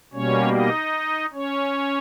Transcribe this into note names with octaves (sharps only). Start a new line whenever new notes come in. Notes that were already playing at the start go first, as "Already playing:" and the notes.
B2 G3 A#3 C#4 C#5
D#4 D#5
C#4 C#5